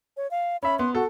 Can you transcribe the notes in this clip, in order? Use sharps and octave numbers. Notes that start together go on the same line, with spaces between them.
C#5
F5
C#4 E5 B5
B3 C6
F#4 A4